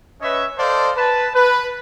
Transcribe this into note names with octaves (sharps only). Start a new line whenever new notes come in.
C#4 B4 C#5 D#5 E5
A4 C5 D5 D#5 F5 A5
B4 A5
B4